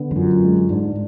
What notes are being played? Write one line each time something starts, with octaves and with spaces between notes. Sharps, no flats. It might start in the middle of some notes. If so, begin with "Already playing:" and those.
Already playing: D3 B3
F2
F#2 F4
G#3
G#2 D4